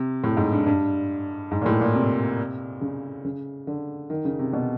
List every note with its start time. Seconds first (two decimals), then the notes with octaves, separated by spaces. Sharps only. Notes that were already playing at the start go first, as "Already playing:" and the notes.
Already playing: C3
0.24 A2
0.37 G#2
0.52 G2
0.66 G2
1.51 G#2
1.61 A#2
1.66 A2
1.81 A#2
1.94 C3
2.81 C#3
3.25 C#3
3.67 D3
4.10 D#3
4.25 C#3
4.39 C3
4.53 B2